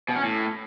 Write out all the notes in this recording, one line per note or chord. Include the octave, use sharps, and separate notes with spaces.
B2
C#4
A2